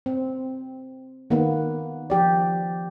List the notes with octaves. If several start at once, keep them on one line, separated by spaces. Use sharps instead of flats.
C4
D#3 A#3 B3
F3 G4 D5